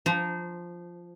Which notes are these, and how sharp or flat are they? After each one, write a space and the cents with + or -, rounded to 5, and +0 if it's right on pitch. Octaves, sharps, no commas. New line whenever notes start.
F3 +0 C5 -25 A#5 +0